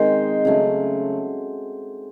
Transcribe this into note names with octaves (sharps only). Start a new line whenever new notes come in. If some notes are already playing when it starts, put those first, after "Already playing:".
Already playing: D#3 G#3 C4 C5
C#3 F#3 A3